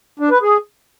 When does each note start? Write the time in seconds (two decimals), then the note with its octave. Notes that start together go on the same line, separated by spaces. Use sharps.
0.20 D4
0.31 B4
0.42 G#4